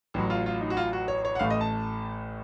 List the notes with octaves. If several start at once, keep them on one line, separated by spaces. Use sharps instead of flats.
A1 A2 F#3
F4
F4
D#4
F#4
F4
F#4
C#5
C#5
F#5
A1 A2 A3 F5
D#5
A5